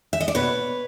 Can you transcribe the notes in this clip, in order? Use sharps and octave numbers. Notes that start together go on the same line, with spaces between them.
E5
D#5
D5
B2 B4 C#5